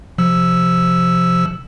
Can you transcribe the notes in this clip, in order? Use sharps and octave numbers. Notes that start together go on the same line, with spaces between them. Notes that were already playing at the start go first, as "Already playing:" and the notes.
C3 F3 E6